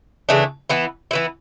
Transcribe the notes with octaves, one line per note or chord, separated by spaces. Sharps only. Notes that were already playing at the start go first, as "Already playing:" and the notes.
C#3 E3 A3 D4
E3 B3 E4
E3 B3 E4